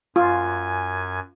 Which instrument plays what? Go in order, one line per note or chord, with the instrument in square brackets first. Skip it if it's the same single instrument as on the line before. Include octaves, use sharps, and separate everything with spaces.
[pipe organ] F#2 G#5 [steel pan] F4